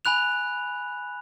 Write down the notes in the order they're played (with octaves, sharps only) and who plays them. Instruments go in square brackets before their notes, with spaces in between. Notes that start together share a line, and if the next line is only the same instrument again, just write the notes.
[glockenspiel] G#5 B5 F#6 F7